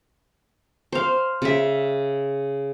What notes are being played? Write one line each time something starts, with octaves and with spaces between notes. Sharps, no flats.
C5 F5
C#3 E5